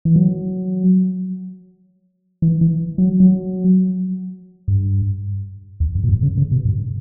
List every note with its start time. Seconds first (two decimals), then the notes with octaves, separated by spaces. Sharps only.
0.05 E3
0.16 F#3
2.42 E3
2.61 E3
2.98 F#3
3.20 F#3
4.68 G2
5.80 E2
5.95 F#2
6.04 A#2
6.09 G2
6.23 C#3
6.37 C#3
6.52 B2
6.65 G2